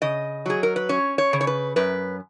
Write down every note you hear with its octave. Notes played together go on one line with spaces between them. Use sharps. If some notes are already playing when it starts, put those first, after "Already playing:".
C#3 D#5
F#3 G#4
A#4
B4
C#4 C#5
C#5
C#3
C#5
B4
F#2 B4